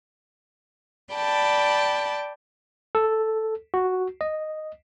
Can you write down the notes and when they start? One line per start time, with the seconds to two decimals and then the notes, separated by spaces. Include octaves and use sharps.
1.14 D5 G5 A5 B5
2.95 A4
3.74 F#4
4.21 D#5